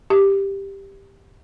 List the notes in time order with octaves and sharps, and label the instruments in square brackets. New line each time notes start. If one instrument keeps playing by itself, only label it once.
[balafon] G4